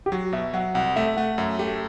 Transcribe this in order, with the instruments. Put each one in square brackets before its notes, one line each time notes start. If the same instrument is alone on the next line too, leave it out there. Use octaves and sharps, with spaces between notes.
[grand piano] G4
[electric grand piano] F#3 [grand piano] F#4
[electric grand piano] B2 [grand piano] E5
[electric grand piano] F#3 [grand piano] F#5
[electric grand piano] C2 [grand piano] F#5
[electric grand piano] A3 [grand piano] E5
[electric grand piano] A3 [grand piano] F#5
[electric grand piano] F#2 [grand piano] E5
[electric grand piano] A3 [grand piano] G4